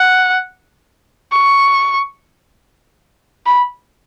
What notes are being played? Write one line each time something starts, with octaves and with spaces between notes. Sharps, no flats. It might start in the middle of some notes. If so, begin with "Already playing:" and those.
Already playing: F#5
C#6
B5